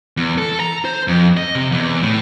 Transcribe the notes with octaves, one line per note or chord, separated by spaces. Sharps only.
E2
A4
A#5
C5
F2
D#5
C3
E2
A2